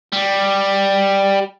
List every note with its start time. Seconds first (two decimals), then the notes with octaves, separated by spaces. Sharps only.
0.12 G3